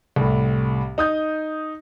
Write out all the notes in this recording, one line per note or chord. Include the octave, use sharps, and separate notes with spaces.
C2 A2
D#4 D#6 G6